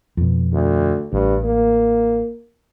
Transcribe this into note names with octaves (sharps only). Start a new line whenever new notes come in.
F2 B2
D2
A1 G2
A#3